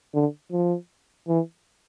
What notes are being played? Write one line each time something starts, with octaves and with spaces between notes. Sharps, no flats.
D3
F3
E3